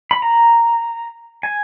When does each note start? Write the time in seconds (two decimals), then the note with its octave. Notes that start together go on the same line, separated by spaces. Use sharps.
0.11 B5
0.22 A#5
1.43 G#5